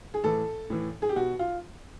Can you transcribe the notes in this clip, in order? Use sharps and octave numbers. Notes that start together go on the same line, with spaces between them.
G#4
A2 E3 A4
A2 E3
G#4
G4
B2 F#4
F4